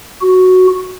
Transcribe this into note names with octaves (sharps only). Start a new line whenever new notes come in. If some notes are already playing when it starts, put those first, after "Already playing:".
F#4